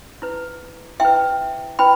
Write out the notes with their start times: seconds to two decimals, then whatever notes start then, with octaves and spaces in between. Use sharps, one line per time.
0.22 E4 B4
1.00 E4 B4 E5 G5
1.79 E4 B4 G5 B5